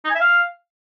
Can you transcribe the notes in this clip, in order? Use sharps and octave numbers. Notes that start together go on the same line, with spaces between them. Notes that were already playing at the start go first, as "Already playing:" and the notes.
D#4
G#5
E5
F5